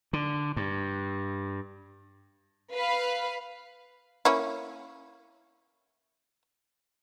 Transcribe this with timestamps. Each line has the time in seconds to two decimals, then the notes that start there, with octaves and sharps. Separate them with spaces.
0.13 D3
0.57 G2
2.73 B4 F5 B5
4.25 A#3 C#4 E4